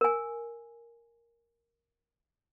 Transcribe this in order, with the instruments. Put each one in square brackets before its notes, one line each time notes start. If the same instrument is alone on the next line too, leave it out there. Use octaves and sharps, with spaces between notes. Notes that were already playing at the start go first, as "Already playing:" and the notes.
[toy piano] A#4 G#5